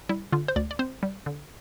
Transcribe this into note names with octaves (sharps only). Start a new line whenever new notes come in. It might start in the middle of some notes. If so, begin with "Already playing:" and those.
G3 E4
D3 F4
C5
D2 D5
D5
C4 C5
G3
D3